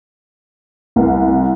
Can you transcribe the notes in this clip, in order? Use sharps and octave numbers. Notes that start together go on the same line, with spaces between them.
C2